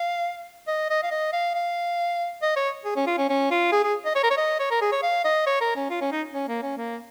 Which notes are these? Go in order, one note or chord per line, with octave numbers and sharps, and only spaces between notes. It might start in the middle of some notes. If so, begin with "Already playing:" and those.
Already playing: F5
D#5
D#5
F5
D#5
F5
F5
D#5
C#5
G#4
C#4
F4
C#4
C#4
F4
G#4
G#4
D#5
C#5
A#4
C#5
D#5
C#5
A#4
G#4
C#5
F5
D#5
C#5
A#4
C#4
F4
C#4
D#4
C#4
A#3
C#4
A#3